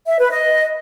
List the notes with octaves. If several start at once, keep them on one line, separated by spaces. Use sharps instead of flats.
E5
B4
D#5